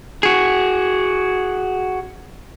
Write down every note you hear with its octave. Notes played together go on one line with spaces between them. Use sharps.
F#4 G#4